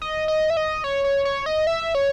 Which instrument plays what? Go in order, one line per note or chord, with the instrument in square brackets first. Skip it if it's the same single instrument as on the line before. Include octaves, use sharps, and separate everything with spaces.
[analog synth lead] D#5
D#5
E5
D#5
C#5
C#5
C#5
D#5
E5
C#5